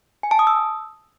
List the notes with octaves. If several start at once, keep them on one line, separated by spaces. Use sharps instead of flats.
G#5
A5
D#6
E6